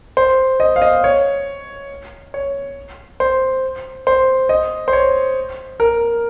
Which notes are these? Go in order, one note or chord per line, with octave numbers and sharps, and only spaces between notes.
C5
D#5
F5
D#5
C#5
C#5
C5
C5
D#5
C5
C#5
A#4